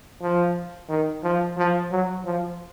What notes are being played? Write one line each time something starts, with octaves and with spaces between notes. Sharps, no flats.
F3
D#3
F3
F3
F#3
F3